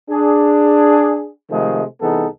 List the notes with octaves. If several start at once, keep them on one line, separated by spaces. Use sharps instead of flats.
D4 G#4
C3 D#3 F3 G#3 A3
C2 E3 B3 D#4 G#4 A4